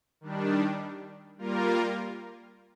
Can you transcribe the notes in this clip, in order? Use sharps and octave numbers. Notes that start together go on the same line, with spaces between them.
D#3 G3 D4
G3 A#3 F4 A#4